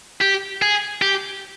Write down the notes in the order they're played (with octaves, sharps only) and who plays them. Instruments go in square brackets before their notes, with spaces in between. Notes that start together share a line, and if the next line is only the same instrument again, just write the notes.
[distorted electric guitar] G4
G#4
G4